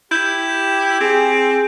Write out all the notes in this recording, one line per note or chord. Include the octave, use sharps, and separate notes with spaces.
E4 G4 G6
C4 G#4